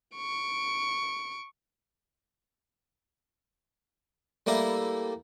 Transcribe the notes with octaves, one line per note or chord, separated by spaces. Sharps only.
C#6 D7
G3 A3 A#3 E4 A4